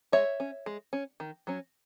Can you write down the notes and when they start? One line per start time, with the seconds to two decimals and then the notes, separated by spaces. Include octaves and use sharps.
0.12 G#3 C#5 E5
0.40 C#4
0.66 G#3
0.93 C#4
1.20 D#3
1.47 F#3 C#4